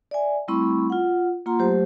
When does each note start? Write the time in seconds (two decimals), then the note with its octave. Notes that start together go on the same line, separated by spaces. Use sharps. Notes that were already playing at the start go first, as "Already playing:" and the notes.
0.11 D5 E5 G#5
0.48 G3 A3 C4 E4 B5 C#6
0.90 F4 F#5
1.46 A#3 F4 F#5 A#5 C6
1.59 F#3 A3 G4 C5